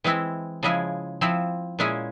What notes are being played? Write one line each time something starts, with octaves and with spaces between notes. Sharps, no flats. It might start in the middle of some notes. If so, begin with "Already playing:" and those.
E3 G#3 C4 E4
C#3 F3 G#3 E4 G#4
F3 C4 E4
A#2 G#3 C#4 E4 G#4